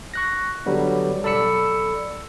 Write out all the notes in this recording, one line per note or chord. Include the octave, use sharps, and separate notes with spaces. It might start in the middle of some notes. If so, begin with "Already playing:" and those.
C#6 F#6 A#6
D3 F#3 G3 B3
B1 A4 D5 B5 E6 C#7